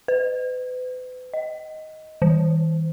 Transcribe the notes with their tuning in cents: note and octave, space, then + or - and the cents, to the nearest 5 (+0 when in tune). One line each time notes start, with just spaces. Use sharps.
B4 +40
D#5 +10
E3 -45